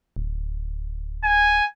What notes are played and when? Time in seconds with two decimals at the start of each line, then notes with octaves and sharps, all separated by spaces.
0.16 D1
1.24 G#5